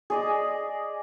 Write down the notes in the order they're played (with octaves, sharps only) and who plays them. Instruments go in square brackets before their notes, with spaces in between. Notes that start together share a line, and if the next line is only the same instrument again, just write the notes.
[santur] G#4 D5 D#5